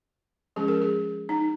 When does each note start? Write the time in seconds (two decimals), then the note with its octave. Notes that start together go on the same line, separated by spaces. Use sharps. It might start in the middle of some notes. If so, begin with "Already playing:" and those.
0.56 F3 G#3 C#4 G#4
0.68 A#4
0.82 G#4
1.29 D#4